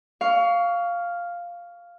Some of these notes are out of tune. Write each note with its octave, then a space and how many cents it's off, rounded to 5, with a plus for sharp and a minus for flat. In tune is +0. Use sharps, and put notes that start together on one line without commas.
F5 +0 C#6 +30